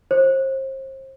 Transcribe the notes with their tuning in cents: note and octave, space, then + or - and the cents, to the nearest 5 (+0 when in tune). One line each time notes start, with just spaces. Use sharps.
C5 +35